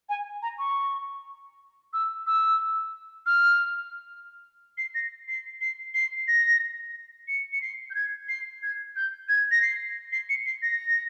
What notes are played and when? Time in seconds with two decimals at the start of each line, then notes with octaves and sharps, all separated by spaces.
0.09 G#5
0.42 A#5
0.59 C#6
1.93 E6
2.27 E6
3.26 F6
4.78 C7
4.95 A#6
5.28 C7
5.61 C7
5.94 C7
6.28 A#6
7.28 C#7
7.53 C#7
7.62 C7
7.90 G6
7.95 G#6
8.29 C7
8.63 G#6
8.96 G6
9.29 G#6
9.51 A#6
9.62 C7
10.12 C7
10.29 C#7
10.46 C7
10.62 A#6